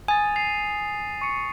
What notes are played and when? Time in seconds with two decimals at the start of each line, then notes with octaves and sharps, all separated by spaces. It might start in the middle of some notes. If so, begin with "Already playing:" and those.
0.08 G#5 D#6 A6
0.36 C7 D#7 F7
1.21 C#6 C#7